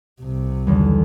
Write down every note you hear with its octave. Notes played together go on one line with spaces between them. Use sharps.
C2 C3
E2 D3 D#3 F#3 G3